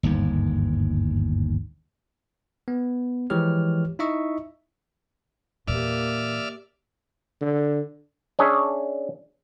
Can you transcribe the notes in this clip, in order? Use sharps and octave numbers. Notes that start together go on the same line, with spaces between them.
G1 D#2 G#2
B3
E3 F3 G#3 G4 C#5 F6
D#4 E4 D#5 E5 C#6
E2 A#2 A#3 G4 D5 E5 F6
D3
C#4 D4 G#4 C#5 E5